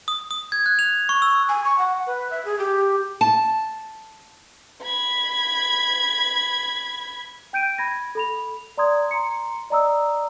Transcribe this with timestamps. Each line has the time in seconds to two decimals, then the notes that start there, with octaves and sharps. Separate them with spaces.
0.08 D#6
0.31 D#6
0.52 G#6
0.66 F#6
0.79 F7
1.09 C#6
1.22 E6
1.49 G#5
1.64 C#6
1.78 F#5
2.07 B4
2.31 E5
2.45 G#4
2.59 G4
3.21 A5
4.82 B5 G#6
7.53 G5 G6 D7 D#7
7.78 B5 G#6 A#6
8.15 A4 B5 F7
8.77 D5 A#5 C6 D#6 G#6
9.11 A#5 C6 C#7
9.70 D5 D#5 A#5 D#6 E6